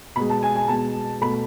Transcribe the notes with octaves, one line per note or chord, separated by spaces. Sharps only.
B2 G#3 B5
A5
G#5
G#5
B2 G#3 A5
B2 A3 B5